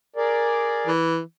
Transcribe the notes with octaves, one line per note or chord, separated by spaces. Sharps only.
G#4 A#4 D5
E3